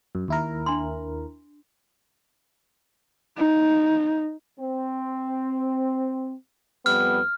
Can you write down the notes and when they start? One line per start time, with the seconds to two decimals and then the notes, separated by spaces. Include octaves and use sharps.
0.15 F#2
0.28 D#2 E4 A#4
0.66 D4 C6
3.38 D#4
4.60 C4
6.86 F2 G3 B3 F6